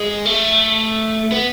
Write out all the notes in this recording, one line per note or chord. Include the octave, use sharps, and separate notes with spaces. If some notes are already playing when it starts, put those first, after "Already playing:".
Already playing: G#3
A3
B3